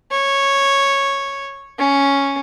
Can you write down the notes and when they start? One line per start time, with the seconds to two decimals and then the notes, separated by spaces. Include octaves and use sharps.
0.11 C#5
1.79 C#4